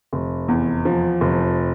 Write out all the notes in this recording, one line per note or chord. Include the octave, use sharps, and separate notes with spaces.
F1
E2
F3
F1